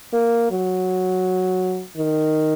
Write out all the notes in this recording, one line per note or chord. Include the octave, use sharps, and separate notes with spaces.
A#3
F#3
D#3